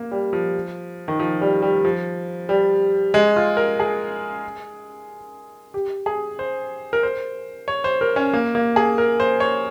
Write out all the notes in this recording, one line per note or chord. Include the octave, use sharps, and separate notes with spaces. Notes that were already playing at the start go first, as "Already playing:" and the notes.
Already playing: A#3
G3
F3
D#3
F3
G3
G3
F3
G3
G#3
F4
A#4
G#4
G4
G#4
C5
A#4
C5
C#5
C5
A#4
C#4
A#3
A#3
G#4
A#4
C5
C#5